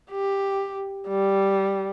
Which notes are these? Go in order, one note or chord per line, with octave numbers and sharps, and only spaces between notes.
G4
G3